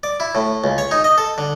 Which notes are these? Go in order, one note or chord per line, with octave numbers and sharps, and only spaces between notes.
D5
E4
A2
C#2
C#5
D#4
D#5
A4
D3